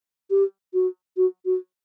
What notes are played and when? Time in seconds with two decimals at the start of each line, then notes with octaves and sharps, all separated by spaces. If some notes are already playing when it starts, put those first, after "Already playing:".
0.30 G4
0.74 F#4
1.17 F#4
1.45 F#4